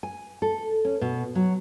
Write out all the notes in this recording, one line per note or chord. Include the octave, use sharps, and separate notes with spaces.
G#5
A4
C#4
B2
F#3